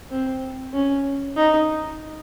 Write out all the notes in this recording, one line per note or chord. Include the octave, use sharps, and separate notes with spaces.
C4
C#4
D#4